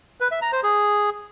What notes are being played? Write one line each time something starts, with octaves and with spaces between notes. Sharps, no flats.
B4
E5
A#5
C5
G#4